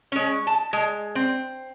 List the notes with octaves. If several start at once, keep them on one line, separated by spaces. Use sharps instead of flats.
G#3 C#4
A5
G#3
C4